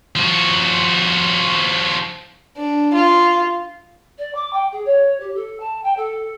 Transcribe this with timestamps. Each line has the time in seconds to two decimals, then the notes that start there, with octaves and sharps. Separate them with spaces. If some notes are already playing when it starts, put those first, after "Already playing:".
0.16 F3 F#4
2.57 D4
2.94 F4
4.18 D5
4.35 D6
4.53 G5
4.72 G#4
4.86 C#5
5.20 G4
5.35 A4
5.60 A5
5.84 G5
5.97 A4